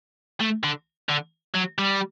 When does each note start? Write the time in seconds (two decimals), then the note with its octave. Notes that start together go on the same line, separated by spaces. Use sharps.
0.41 A3
0.64 D3
1.09 D3
1.55 F#3
1.78 G3